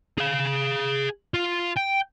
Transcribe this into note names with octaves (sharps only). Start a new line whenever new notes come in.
G#4 F5
F4
G5